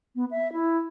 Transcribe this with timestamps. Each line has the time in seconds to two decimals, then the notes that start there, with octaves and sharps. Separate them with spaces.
0.16 B3
0.31 E5
0.53 E4